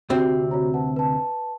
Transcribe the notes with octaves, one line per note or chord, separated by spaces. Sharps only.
D2 C3 C4 F#4
F#4 C#5 A#5
B4 F#5 A5
B4 A5